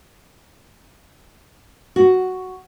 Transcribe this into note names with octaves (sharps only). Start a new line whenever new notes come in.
F#4